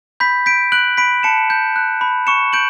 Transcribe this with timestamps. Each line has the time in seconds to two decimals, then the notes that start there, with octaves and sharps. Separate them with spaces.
0.20 B5 G6 B6
0.46 G6 B6 D7
0.72 F#6 D7 F#7
0.97 B5 B6 D7
1.23 A5 C#7 E7
1.50 G6
1.76 F#6
2.01 B5
2.27 C#6 C#7 E7
2.53 G6 D7 F#7